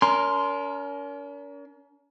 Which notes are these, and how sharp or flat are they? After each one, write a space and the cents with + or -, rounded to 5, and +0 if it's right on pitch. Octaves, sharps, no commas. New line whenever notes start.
C#4 +45 A#4 +5 C6 +0